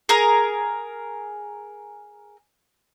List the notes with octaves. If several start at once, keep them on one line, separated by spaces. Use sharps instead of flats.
G#4 A#4